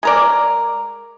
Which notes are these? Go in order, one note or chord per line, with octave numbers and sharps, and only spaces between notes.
G#3 A#4 D5